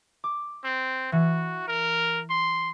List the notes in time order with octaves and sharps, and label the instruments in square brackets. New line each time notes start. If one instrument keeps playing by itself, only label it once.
[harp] D6
[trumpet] C4
[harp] E3 [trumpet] F#4
[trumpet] A#4
C6